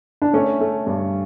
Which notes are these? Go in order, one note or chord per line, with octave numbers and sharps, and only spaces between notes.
D4
A3 C#4
A3
G2